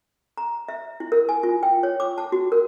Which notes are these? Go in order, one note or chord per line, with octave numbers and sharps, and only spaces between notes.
A#5
E5
E4
A#4
G#5
F4
G5
C#5
D6
A5
F#4
A#4